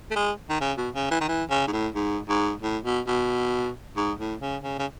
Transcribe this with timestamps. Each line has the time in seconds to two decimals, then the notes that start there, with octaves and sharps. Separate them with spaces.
0.11 A3
0.16 G#3
0.50 D#3
0.61 C#3
0.78 B2
0.95 C#3
1.11 E3
1.21 D#3
1.28 E3
1.50 C#3
1.67 G#2
1.73 A2
1.95 G#2
2.29 G#2
2.62 A2
2.84 B2
3.07 B2
3.97 G#2
4.19 A2
4.41 C#3
4.63 C#3
4.79 C#3